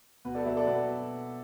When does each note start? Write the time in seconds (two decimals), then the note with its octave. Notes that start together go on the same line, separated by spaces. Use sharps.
0.25 B2 F#4 B4
0.35 A4 D5
0.46 F#3 B4 E5
0.57 A4 D5
0.67 B2 F#4 B4